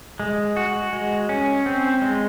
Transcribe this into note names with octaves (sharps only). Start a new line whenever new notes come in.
G#3
F#4
G#3
C#4
C4
G#3